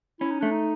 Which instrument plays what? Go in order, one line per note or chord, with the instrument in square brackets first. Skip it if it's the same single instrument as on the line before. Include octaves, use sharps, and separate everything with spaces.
[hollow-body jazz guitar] C#4 [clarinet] E4
[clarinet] D#4
[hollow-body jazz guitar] A3 [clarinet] D4
[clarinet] D#4